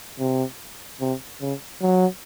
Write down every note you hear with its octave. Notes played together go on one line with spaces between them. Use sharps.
C3
C3
C#3
F#3